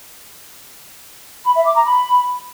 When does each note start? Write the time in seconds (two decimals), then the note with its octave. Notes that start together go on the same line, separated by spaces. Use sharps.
1.45 B5
1.55 E5
1.65 D6
1.75 A#5
1.86 B5